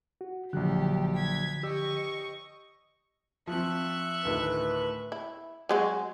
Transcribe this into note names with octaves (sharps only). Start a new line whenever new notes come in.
F#4
A#1 D3 F3 F#3 G4 F#6
G#6 B6
G4 D#5 C#6 E6
F3 C4 E5 C#6 F#6
D2 A2 D#3 B4
E4
F#3 G#3 F#4